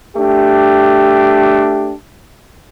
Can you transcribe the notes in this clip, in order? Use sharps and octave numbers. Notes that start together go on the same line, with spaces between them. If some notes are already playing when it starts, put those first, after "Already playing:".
A3 D4 G4